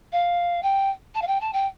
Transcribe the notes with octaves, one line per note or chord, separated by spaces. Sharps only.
F5
G5
A5
F5
G5
A5
G5